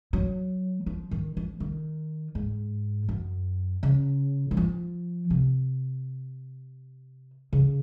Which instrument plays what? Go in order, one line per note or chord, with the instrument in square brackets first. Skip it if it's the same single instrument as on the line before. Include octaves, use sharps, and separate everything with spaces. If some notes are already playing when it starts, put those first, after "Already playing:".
[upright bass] F#3
F3
D#3
F3
D#3
G#2
F#2
C#3
F#3
F3
C3
C#3